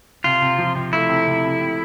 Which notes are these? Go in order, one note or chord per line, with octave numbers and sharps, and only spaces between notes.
C3 F4
C3
F3
C3
A3 E4
C3
C3
C3
C3